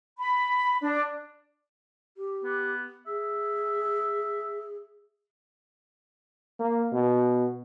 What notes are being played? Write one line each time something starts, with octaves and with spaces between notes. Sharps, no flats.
B5
D4
G4
B3
G#4 E5
A#3
B2